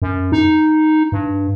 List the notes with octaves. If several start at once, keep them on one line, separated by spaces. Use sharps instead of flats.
F#2
D#4
G2